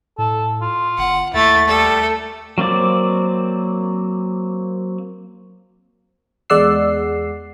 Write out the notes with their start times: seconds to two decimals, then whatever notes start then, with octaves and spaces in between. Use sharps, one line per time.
0.18 A2 A4
0.62 F4
0.98 G1 F#5
1.34 D#2 A3 E4 A6
1.68 G3 A3 A4
2.58 F#3 A#3 C4 D5
6.50 E2 G#3 D5 F#5 E6 C7